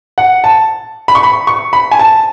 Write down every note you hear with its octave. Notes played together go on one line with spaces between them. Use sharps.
F#5
A5
B5
C#6
B5
C#6
B5
G#5
A5